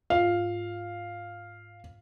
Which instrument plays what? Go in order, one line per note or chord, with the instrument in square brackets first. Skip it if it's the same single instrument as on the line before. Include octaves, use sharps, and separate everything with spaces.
[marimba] G#2 F4 [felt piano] F5